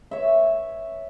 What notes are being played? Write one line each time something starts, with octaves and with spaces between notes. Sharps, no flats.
C#5 E5